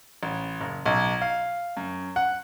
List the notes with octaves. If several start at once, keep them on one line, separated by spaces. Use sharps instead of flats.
A1
F#1
B1
F5
F#2
F#5